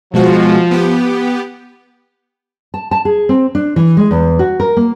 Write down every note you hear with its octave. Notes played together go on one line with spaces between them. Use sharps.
B2 F3 G#3 F#4
B3 G4
A5
A5
G#4
C4
D4
E3
G#3
E2
F#4
A#4
A#3